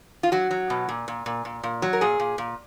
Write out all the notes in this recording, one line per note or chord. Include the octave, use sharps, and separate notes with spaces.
F4
F#3 F#4
F#3
B2
A#2
A#2
A#2
A#2
A#2
F#3
A#4
A#2 G#4
A#2
A#2